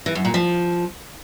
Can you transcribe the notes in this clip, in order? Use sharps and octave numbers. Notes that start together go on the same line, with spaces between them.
E3
F#2
A#2
F3